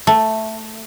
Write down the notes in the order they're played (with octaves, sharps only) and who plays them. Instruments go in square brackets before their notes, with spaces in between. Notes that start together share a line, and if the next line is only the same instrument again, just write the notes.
[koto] A3